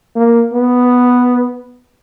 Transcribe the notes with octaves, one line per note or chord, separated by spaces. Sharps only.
A#3
B3